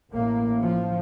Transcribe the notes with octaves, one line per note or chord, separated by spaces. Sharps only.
A1 A2 A#3
F3